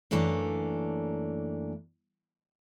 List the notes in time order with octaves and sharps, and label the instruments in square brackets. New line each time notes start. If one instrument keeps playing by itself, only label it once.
[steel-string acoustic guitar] F#2 E3 A3 A#3 D4